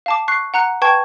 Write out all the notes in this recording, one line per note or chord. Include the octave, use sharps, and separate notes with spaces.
F5 A5 D6
C#6 F#6 C7
F#5 A#5 F#6 C#7
B4 G5 A5 C#6 G#6